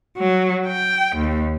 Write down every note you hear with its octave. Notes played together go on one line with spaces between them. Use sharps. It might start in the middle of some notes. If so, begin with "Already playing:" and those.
F#3
G5
D#2